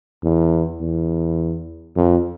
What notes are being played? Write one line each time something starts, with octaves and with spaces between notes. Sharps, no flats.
E2
E2
F2